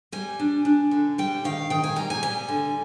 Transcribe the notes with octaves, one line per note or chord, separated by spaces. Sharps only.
G3 G#5
D4
D4
D3
G3 G5
D#3 F5
D#3 G5
G#5
G3 A#5
G#5
G3 G#5
D3